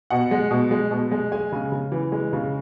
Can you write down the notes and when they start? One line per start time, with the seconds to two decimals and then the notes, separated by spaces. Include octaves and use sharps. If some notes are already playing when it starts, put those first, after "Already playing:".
0.10 B2 F#5
0.31 G#3
0.51 B2
0.71 G#3
0.91 B2
1.11 G#3
1.32 G#3 G#5
1.52 C#3
1.72 C#3
1.92 E3
2.12 G#3
2.33 C#3